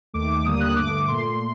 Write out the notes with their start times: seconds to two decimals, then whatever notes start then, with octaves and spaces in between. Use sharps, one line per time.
0.14 D#2 D#3 A3 D6
0.30 D6
0.45 D#2 D3 G3 A#3 D#6
0.60 F#6
0.76 G2 D3 A3 D6
1.08 A#2 A3 C6